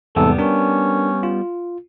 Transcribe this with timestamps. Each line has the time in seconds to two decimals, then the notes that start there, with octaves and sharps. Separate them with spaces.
0.16 E2 G#2 C3 G3 B3 A4
0.39 C#4 D4 A#4
1.23 F4